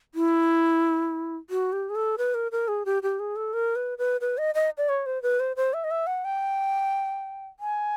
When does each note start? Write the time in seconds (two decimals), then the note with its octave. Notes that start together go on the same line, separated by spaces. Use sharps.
0.15 E4
1.50 F#4
1.73 G4
1.90 G#4
1.95 A4
2.18 B4
2.34 A#4
2.52 A#4
2.68 G#4
2.86 G4
3.03 G4
3.19 G#4
3.36 A4
3.53 A#4
3.76 B4
3.98 B4
4.21 B4
4.38 D#5
4.55 D#5
4.77 D5
4.89 C#5
5.06 C5
5.22 B4
5.40 C5
5.56 C5
5.74 E5
5.84 D#5
5.91 E5
6.07 F#5
6.25 G5
7.60 G#5